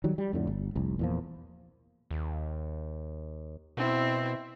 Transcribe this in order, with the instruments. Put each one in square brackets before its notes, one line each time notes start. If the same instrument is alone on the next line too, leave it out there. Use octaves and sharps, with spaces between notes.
[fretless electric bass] D#3 F#3 G3
G3
F2 A2 D3
G1
F1 C2
E2 A#2 F3
[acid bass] D#2
[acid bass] B2 [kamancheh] C4 E4